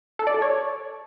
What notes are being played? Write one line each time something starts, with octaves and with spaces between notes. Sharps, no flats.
A4
D5
A4
C#5